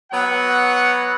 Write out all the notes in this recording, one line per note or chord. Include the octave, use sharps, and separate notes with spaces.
F#3 B3 C#5 F#5